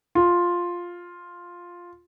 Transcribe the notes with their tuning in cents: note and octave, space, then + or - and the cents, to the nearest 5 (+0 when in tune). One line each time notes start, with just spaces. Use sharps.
F4 +5